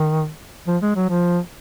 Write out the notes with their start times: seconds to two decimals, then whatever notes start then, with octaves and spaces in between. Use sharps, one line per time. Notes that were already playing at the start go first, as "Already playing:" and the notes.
Already playing: D#3
0.67 F3
0.82 G#3
0.96 F#3
1.09 F3